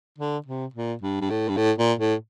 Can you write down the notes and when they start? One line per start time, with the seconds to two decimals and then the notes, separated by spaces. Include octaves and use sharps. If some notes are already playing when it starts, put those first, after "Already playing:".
0.18 D3
0.46 C3
0.74 A#2
1.02 G2
1.21 G2
1.30 A2
1.48 G2
1.57 A2
1.78 A#2
1.99 A2